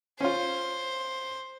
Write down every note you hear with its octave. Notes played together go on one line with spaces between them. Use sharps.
C#4 F4 C5